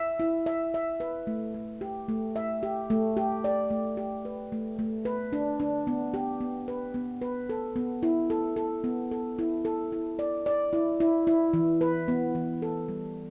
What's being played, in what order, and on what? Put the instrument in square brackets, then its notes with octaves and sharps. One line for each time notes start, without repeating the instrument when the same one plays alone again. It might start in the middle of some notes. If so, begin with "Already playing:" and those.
Already playing: [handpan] E5
E4
E5
E5
B4
A3
A3
G4
A3
E5
G4
A3
G4
D5
A3
G4
B4
A3
A3
B4
D4
D4
B3
G4
B3
B4
B3
B4
A4
B3
E4
A4
A4
B3
A4
E4
A4
E4
D5
D5
E4
E4
E4
E3
B4
B3
E3
A4
G3